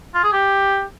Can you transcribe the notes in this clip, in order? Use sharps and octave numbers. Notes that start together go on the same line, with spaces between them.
F4
G#4
G4